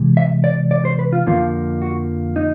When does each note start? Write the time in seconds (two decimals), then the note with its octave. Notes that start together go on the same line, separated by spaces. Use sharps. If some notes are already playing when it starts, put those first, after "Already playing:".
Already playing: C3 E3 G#3
0.17 E5
0.44 D5
0.71 D5
0.85 C5
0.99 B4
1.13 F4
1.26 F2 D3 F3 A#3 F4
1.82 F#4
2.36 D#4